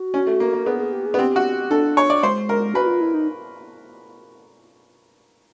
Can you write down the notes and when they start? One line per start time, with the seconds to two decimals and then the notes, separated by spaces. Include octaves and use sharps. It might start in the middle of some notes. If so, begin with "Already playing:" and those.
Already playing: F#4
0.14 C#4
0.27 A3
0.40 A#3
0.53 A#3
0.66 B3 G#4
0.79 G#4
0.92 G4
1.06 G#4
1.14 B3
1.19 C4 G4
1.36 F#4
1.71 D4 A4
1.97 C#5
2.10 D5
2.23 G#3 C5
2.49 A#4
2.74 F#4 B4
2.87 F4
3.01 E4
3.14 D#4